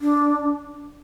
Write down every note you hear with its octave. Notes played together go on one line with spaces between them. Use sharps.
D4